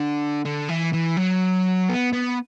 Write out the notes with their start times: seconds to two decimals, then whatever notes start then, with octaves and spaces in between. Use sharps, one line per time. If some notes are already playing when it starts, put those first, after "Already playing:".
Already playing: D3
0.45 D3
0.68 E3
0.93 E3
1.17 F#3
1.89 B3
2.13 B3